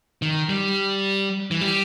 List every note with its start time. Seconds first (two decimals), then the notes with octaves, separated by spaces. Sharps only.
0.22 D#3
0.49 G3
1.51 E3
1.61 G3